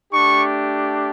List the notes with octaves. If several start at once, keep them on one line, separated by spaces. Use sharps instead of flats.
A3 D4 G4 C#6